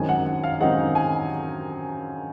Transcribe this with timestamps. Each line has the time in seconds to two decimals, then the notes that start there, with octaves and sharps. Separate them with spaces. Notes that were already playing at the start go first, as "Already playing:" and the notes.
Already playing: F#2 D#3 G#3 C4 D#4 G#5
0.09 F#5
0.27 F#5
0.44 F5
0.61 F#2 D#3 G#3 C4 D#4 F#5
0.95 G#5